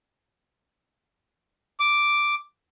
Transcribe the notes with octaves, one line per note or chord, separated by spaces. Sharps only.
D6